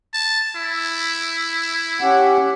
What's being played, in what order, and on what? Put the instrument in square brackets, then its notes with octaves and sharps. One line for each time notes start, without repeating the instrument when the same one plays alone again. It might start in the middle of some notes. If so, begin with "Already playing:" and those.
[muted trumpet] A5
E4
[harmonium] C#4 G4 F#5